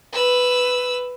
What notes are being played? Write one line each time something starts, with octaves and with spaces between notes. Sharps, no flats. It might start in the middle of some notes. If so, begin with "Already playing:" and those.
B4 E6